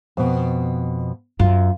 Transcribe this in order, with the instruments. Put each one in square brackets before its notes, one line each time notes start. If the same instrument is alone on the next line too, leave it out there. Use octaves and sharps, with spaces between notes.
[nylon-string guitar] F2 B2
[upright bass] F#2 [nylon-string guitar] F4